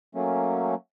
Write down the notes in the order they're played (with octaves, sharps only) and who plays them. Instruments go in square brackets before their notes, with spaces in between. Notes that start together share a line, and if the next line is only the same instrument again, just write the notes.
[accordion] F#3 A3 A#3 C#4